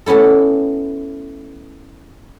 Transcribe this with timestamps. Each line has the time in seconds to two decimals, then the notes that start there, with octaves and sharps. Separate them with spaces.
0.06 A3 B3 C#4 E4 A4